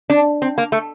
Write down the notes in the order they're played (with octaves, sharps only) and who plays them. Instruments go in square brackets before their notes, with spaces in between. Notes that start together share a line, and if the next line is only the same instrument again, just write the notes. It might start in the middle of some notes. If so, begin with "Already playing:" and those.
[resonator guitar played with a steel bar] D4
C4
A#3
A3